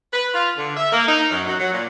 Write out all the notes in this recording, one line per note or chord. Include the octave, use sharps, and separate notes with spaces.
B4
F4
D3
E5
A#3
D#4
F#2
F#3
F#3
A#2